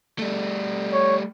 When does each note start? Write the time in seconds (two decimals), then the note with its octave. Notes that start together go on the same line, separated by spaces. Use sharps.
0.19 G3 A3
0.92 C#5